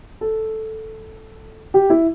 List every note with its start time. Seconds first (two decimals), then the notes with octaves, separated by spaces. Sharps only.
0.21 A4
1.74 G4
1.90 E4